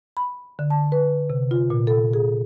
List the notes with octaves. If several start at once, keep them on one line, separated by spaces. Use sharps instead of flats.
B5
D3
A5
B4
C3
F4
A#2
A4
G#4